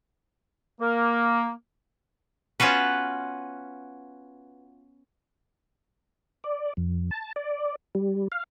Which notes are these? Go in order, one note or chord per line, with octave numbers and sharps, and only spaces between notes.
A#3
B3 C#4 F4 F#4 B4
D5
F2
A5
D5
G3
F5